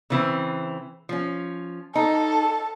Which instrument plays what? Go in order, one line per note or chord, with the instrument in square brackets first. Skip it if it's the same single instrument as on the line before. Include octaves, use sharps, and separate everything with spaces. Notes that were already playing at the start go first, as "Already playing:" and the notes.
[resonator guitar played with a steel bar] C#3 E3 C4
F3 C#4
[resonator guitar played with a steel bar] D#4 [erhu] A4